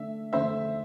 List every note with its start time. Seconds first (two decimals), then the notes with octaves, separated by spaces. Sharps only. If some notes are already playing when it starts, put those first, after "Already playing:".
Already playing: D3 A3 D4 E5
0.33 D3 A3 D4 C5 E5